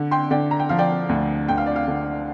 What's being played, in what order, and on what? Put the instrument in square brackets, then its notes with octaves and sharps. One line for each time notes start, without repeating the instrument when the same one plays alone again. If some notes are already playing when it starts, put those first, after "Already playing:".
Already playing: [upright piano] D3
G5 C6
D3 D5 G5
A#5
G5
F3 F5
D5 G5
D2
D2 G5
F5
D5
F5
D3